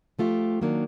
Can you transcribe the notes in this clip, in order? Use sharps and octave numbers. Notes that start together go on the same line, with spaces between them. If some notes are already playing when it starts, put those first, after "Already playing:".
F3 A3 F4 G4
D#3 F#3 A#3 D4